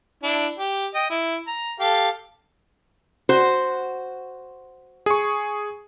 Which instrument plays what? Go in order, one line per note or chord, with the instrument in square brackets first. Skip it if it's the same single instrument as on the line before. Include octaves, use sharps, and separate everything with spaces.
[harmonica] D4 E4
G4
D#5 G5
E4
A#5
G4 A4 F5
[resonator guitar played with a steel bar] F#4 C5
[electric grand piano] G#4 C#6